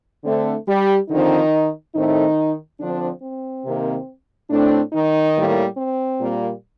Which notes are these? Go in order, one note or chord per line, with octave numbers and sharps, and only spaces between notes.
D3 A3 C4
G3 G4
D3 D#3 F3 C4 D#4
A2 D#3 A3 C4 D#4
D3 F3 C4 D4
C4
C3 D#3 A#3
A2 A3 C4 D4
D#3 D#4
A2 G3 A#3
C4
A#2 G3 A#3